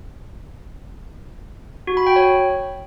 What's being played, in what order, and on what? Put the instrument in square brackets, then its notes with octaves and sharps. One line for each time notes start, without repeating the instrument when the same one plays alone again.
[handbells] F#4
B5
G5
C#5